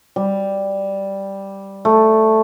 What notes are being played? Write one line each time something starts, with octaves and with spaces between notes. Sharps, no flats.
G3
A3